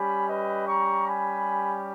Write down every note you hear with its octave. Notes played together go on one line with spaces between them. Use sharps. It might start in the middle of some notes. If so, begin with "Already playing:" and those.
Already playing: G3 C#4 G4 G#5 B5
B4 D#5
A#5 C#6
G#5 B5